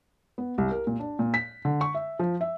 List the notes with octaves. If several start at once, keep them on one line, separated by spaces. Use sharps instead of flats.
B3
C2
A#4
A#2
D4
A#2
B6
D3
C#6
E5
F3
E5